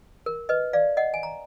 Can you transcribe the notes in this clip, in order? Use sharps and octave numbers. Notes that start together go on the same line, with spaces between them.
A#4
B4 D#5
D5 F5
D#5 F#5
G#5
A#5